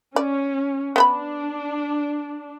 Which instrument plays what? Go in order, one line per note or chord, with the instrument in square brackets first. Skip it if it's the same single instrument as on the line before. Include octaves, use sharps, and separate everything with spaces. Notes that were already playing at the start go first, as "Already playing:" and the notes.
[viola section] C#4 [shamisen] D5
[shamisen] B3 C5 B5 [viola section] D4